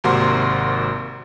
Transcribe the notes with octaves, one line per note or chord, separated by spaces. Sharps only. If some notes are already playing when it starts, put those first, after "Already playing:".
G#1 C3 A#3 F#4 C6